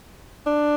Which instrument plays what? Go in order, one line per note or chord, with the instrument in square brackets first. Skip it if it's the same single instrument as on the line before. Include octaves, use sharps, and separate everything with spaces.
[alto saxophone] D4